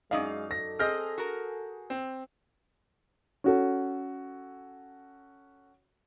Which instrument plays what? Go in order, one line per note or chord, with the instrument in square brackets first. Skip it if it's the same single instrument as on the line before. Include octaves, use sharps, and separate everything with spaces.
[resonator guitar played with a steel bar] F#2 D#4 D5 [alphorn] G#3 [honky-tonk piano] F5
[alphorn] A4 [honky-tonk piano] A#6
[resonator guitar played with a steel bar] C4 D#5 [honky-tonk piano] G#4 [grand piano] F6 G6 A#6
[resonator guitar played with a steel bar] F#4 A#4
[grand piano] C4
[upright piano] C#4 F#4 A4